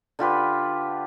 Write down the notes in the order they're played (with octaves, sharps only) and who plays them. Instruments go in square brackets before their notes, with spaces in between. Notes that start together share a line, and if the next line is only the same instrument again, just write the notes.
[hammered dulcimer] D3 F4 G4 B4